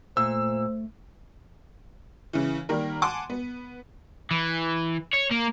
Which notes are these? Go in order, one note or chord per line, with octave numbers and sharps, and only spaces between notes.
A#2 A3 C5 E6
C#3 E3
D#3 G3 A#3 A#4
F#5 G#5 A5 C6 D6
B3
E3
C#5
A#3